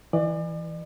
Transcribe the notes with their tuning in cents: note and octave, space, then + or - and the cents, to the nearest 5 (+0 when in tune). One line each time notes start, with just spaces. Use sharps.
E3 +0 D5 +35